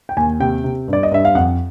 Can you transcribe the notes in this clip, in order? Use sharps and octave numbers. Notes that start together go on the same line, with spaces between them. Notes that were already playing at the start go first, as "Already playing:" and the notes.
G5
D#2 G#5
C3 G5
C3
G2 D5
D#5
G2 E5
F5
F2 F#5